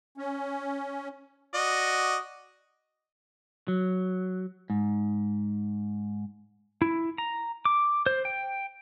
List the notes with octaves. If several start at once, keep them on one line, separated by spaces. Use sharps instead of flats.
C#4
F#4 D5 D#5
F#3
G#2
E4
A#5
D6
C5
G5